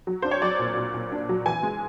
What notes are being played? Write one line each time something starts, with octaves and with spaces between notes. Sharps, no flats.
F#3
D4 C5
C#5
F#3 D5
A#2
A#2
A#2
D4
F#3
E3 G#5
G#3